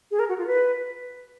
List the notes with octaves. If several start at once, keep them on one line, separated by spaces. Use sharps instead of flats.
G#4
A#4
F#4
F4
B4